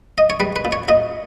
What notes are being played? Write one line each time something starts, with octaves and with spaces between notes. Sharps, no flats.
D#5
C#5
G3 B4
B4
A#2
C#5
A#2 D#5